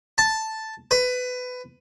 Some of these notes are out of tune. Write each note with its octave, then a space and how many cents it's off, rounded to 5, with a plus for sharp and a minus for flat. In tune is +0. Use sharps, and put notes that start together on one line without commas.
A5 +0
B4 +20